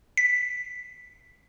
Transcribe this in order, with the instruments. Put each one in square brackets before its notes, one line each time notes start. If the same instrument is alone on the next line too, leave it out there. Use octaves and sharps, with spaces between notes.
[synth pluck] B6